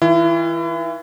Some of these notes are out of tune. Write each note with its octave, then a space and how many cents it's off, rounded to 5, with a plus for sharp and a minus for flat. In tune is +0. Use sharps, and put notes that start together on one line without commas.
E3 -35 E4 +35